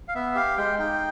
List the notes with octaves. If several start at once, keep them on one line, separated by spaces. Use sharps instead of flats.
F5
B3 E5
G4 F5
G#3 G5
D#4 G5